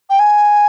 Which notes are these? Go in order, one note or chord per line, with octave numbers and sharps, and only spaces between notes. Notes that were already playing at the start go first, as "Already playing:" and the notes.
G5
G#5